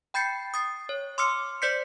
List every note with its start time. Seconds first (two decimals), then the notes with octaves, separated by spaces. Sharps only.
0.14 G5 B5 G6 A6 C7 C#7
0.54 D#6 A6 C7
0.89 C#5
1.18 C6 D6 E6 F6 C#7
1.62 C5 D5 G6 B6 C#7